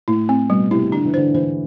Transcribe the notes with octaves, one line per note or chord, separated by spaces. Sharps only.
A2 E4
C4
B2 G3
C3 E4
D3 D4
E3
D3 C5
E3 C5